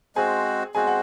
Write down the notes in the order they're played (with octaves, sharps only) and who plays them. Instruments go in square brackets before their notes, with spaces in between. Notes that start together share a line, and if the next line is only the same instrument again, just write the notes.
[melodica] G#3 C4 F#4 C5 [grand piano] G#4 G#5
[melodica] G#3 C4 F#4 C5 [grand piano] G#4 G#5
[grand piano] F#5